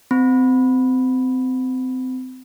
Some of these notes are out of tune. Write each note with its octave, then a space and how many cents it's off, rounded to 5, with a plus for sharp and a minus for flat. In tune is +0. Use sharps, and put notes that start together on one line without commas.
C4 -30 B5 +0